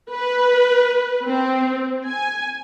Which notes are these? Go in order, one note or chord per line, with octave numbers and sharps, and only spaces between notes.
B4
C4
G#5